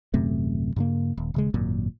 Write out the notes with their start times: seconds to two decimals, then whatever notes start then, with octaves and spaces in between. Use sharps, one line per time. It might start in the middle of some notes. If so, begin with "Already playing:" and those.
0.14 D#1 F#2 C3 A3
0.76 G2 C#3 A#3
1.17 D#1
1.34 D#1 C#3 G#3
1.54 G#1 F#2 A#2